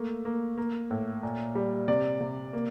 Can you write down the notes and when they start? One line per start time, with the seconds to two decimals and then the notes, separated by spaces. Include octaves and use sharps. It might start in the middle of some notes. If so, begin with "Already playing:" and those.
Already playing: A3 A#3
0.25 A#3
0.58 A#3
0.91 A2
1.23 A#2
1.55 G3
1.88 C3 D5
2.21 C3
2.53 A#3